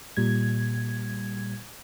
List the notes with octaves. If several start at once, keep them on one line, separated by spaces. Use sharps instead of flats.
A#2 G3 G#6